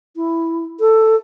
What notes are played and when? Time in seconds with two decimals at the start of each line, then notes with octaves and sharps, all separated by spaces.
0.16 E4
0.80 A4